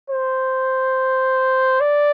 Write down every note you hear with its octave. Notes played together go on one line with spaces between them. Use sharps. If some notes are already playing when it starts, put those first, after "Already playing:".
C5
D5